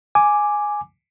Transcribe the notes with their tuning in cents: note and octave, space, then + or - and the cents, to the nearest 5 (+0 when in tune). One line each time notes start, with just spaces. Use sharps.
G#5 +0 D6 +0